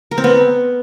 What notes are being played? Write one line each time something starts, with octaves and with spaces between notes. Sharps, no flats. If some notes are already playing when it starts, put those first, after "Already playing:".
A#4
C4
B3